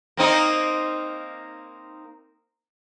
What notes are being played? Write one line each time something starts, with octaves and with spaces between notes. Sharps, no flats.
A#3 C4 D#4